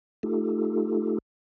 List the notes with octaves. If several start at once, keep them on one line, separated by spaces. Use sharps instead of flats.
A3 D#4 F4 G4 A4